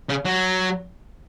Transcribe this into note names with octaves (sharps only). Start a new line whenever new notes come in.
C#3
F#3